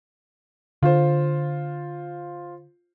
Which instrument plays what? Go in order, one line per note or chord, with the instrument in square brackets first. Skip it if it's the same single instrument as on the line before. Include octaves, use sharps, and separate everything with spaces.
[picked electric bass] D3 [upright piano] F4 C5